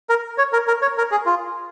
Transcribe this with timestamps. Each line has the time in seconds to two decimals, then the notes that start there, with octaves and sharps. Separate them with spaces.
0.09 A#4
0.38 C#5
0.53 A#4
0.67 A#4
0.82 C#5
0.98 A#4
1.11 G#4
1.26 F4